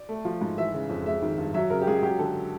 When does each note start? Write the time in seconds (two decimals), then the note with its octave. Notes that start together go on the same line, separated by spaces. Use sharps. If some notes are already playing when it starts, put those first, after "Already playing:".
Already playing: D5
0.09 A3
0.25 F3
0.41 G#2
0.58 E3 E5
0.74 C#3
0.89 F2
1.06 G#3 E5
1.22 D#3
1.38 G2
1.54 F#3 E5
1.70 C#3 A#4
1.82 G4
1.87 C#2 G#4
2.03 F#3 G4
2.19 D3 A4